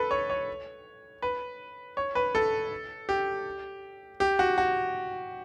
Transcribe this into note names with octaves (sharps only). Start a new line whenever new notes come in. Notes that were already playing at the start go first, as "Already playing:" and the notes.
Already playing: A4 B4
C#5
C#5
B4
C#5
B4
A4
G4
G4
F#4
F#4